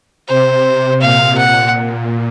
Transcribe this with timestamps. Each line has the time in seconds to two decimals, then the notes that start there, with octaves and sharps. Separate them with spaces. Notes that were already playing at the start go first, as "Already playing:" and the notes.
0.28 C3 C5
1.01 A#2 F5
1.37 A#2 F#5